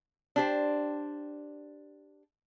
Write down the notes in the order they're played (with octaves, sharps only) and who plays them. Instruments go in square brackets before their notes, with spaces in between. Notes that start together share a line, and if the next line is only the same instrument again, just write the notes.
[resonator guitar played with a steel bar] D4 G4 C5